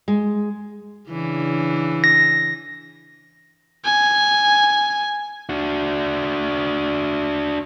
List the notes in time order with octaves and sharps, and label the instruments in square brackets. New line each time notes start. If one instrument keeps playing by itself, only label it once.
[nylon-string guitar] G#3
[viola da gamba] C#3 E3 D4
[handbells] A#6
[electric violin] G#5
[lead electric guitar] D4 F#4